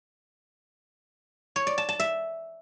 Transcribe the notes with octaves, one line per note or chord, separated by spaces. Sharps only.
C#5
D5
A5
A5
E5